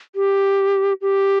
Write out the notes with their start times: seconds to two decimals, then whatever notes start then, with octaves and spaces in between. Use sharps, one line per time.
0.15 G4
1.02 G4